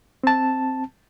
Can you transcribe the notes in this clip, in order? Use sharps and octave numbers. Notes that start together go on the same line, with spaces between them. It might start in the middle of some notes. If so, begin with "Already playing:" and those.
C4 A5